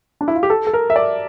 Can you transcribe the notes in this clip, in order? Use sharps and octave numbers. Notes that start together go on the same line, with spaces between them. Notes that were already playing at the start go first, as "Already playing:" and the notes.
D4
E4
F4
G4
A4
A4
A#4
E5
D5